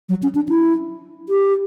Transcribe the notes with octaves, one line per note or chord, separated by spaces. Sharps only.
F#3
C#4
D4
E4
G4